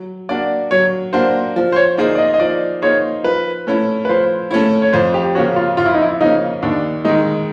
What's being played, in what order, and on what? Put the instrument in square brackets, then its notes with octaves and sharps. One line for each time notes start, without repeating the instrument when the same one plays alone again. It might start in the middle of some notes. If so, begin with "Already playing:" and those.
Already playing: [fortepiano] F#3
[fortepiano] A#3 D4 F#4 [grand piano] D5
[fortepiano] F#3 [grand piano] C#5
[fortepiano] A#3 D4 F#4 [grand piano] C5
[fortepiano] F3
[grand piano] C5
C#5
[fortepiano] A#3 D#4 G#4 C5 [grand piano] D5
[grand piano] D5
D#5
D#5
[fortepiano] F3 [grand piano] D5
[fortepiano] A#3 D#4 G#4 C5 [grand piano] C#5
[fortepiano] F3 [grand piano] B4
[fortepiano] A3 C#4 E4
[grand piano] B4
[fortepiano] F3 [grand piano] C5
[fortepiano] A3 C#4 E4 [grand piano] C#5
[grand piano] C#5
[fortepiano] F2 [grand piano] C5
[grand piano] G4
[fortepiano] C#3 F3 A#3 C#4 [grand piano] F#4
[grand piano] F4
[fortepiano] F2 [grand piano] F4
[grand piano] E4
D#4
E4
[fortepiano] C#3 F3 A#3 C#4 [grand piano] D#4
[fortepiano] D#2 [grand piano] D4
[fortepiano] D#3 G#3 [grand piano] D#4